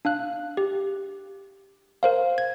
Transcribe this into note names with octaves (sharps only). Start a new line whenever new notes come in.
D4 F5 F#6
G4
A#4 C5 F5
G#6